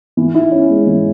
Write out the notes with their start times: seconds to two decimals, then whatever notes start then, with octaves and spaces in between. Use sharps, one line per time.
0.17 E3
0.34 E4
0.51 C#4
0.69 G#3
0.87 E3